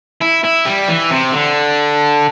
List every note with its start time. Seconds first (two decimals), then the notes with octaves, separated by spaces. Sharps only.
0.21 E4
0.44 E4
0.66 G3
0.88 E3
1.10 C3
1.32 D3